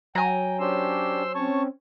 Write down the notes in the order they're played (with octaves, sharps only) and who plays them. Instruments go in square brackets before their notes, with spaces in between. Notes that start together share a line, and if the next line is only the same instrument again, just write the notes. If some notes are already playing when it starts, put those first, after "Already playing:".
[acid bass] F#3 [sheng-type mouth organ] G5 [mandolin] G#5 A#5
[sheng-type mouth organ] C#4 D4 G4 [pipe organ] C5 C6 E6
[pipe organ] C4 C#4 [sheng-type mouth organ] C#5 A5 C#6